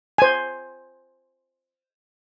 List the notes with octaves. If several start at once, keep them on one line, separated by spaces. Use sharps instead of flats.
C5 G#5